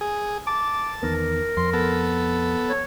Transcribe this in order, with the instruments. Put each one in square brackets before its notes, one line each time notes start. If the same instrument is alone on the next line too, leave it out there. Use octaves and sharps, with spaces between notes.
[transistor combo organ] G#4
[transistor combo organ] A5 [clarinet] D6
[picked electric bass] E2 D#3 B3 [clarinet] A#4
[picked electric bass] F2 [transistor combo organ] C6
[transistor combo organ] B3 A4
[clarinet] C#5